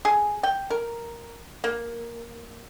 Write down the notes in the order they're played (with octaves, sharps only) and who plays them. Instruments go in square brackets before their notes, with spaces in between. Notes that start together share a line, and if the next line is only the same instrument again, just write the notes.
[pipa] G#4
G5
A#4
A#3